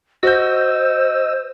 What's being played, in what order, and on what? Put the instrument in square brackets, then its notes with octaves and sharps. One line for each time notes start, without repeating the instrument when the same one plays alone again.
[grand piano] F#4 G6 [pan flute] C5 [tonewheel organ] D#5 E6